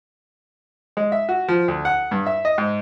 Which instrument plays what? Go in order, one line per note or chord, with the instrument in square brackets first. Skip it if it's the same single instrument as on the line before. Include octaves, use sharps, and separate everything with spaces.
[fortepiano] G#3
E5
F#4
F3
D2
F#5
G2
E5
D#5
G#2